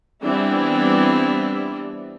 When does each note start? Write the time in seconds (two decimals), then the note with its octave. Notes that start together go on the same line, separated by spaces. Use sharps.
0.24 E3 G3 B3 C4 D4 E4